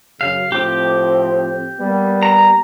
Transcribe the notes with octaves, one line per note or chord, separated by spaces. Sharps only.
F#2 C#3 F5
A2 F3 C4 G4 D6
G3 A#3 B3
A#5